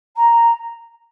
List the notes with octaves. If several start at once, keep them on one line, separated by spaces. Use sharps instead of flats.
A#5